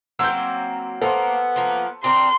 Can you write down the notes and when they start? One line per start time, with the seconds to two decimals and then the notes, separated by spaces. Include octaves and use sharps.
0.19 F#3 A#3 C4 E6 G6
1.02 A#3 B3 A4 C5
1.56 F3 A#3
2.04 C4 D4 A#4 C6